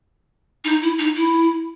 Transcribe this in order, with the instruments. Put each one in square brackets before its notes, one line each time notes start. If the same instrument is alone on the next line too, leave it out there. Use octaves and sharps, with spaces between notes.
[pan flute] D#4
E4
D#4
E4